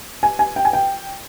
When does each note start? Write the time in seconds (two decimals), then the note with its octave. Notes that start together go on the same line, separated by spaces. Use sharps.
0.23 G#5
0.39 G#5
0.56 G5
0.65 G#5
0.73 G5